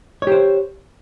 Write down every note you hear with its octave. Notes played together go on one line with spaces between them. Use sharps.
G4 C5 C#5